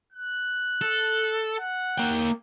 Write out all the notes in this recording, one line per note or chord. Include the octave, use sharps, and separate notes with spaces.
F#6
A4
F#5
A#3 G5